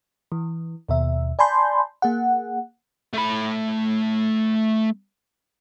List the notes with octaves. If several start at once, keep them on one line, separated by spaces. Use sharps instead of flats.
E3
D#2 B2 E5
D5 G#5 A5 B5 C6 G6
A#3 G#4 F#5
A3 B5